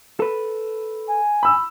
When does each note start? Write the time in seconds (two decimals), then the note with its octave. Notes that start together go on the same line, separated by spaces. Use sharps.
0.20 A4 B4
1.08 G#5
1.43 B5 E6